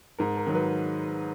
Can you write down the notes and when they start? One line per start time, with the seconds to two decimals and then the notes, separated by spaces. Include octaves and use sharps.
0.19 G#2 A#4
0.37 A#4
0.47 D#3 F#3
0.55 B4